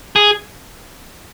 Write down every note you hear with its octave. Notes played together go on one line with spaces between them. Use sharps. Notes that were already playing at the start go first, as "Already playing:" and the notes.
G#4